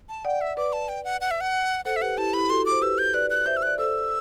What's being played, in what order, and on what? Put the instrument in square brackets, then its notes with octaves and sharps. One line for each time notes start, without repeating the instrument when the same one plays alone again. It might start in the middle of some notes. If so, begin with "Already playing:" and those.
[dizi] A5
[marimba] D5 F#5 [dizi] G5
[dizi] E5
[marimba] B4 D5 [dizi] D6
[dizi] A5
G5
F#5
F#5
E5
F#5
[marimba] A4 C5 [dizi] F#5
[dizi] E5
[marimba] G4 B4 [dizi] F#5
[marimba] E4 G4 [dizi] A5
[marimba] E4 G4 [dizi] B5
[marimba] F#4 A4 [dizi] C6
[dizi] D6
[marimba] C5
[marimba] G4 B4 [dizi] E6
[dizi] G6
[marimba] B4 D5 [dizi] F#6
[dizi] F#6
[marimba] C5 E5 [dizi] G6
[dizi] E6
[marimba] D5 [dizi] F#6
[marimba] A4 C5 [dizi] E6